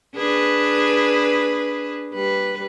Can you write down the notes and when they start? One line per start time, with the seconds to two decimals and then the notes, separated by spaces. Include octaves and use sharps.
0.16 D4 G#4 B4
2.13 G3 B4